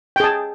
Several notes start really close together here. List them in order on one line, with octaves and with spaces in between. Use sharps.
G5 G#4 A5